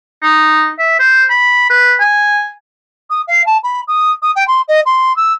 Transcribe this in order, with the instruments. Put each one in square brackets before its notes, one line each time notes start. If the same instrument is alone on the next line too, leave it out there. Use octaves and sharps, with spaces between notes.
[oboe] D#4
E5
C5
B5
B4
G#5
[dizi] D#6
F5
A5
B5
D#6
D#6
G5
C6
D#5
C6
E6